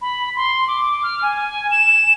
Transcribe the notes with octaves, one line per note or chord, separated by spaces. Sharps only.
B5
C6
D6
F6
G#5
E7